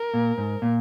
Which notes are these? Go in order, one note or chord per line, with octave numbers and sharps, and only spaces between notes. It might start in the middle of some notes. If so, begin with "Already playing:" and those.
Already playing: A#4
A#2
G#2
A#2